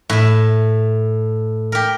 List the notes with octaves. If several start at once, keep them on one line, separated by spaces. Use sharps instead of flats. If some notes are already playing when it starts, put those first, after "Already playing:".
A2 E5
G4 A#4